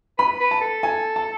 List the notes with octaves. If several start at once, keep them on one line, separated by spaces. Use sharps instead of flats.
B4 B5
B4
A5
A4
G#5
A5